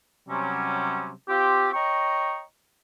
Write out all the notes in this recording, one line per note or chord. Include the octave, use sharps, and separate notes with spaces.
C3 F#3 G3 C#4
C4 F4 G4
C#5 D#5 G5 A#5 C#6